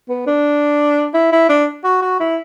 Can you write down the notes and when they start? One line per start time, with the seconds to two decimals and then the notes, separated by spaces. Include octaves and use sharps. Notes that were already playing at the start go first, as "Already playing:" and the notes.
0.09 B3
0.27 D4
1.14 E4
1.32 E4
1.49 D4
1.84 F#4
2.02 F#4
2.20 E4